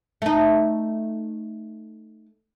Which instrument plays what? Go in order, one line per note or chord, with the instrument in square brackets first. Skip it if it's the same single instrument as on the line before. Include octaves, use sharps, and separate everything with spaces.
[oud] A3 D#4